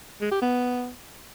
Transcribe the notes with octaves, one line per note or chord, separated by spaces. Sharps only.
G#3
G4
B3